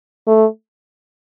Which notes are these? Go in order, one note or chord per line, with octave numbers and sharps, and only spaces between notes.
A3